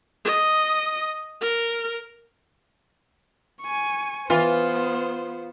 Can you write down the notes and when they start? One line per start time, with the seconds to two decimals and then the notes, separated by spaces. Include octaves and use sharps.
0.25 D#5
1.41 A#4
3.62 G#5 C#6
4.30 E3 B3 F4 C5